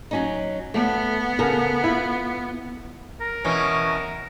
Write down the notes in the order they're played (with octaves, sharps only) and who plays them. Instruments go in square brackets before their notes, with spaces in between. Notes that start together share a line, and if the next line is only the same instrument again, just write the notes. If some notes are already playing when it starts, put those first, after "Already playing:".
[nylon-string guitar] F#3 C#4 D#4
[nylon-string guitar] A3 [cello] B3
[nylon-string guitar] C#3 A4 A#4
E4 F4
[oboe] A#4
[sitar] B2 E3 C#4